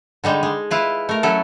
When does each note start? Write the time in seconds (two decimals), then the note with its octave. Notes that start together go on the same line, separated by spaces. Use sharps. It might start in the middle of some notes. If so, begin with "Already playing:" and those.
0.24 D3 G3 G#3 D#4
0.43 G#3
0.71 E4 F4 B4
1.09 A3 A#4
1.23 F#3 C#4 E4 A4